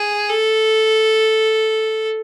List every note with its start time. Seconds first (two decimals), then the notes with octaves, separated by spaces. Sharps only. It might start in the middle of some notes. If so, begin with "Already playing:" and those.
Already playing: G#4
0.29 A4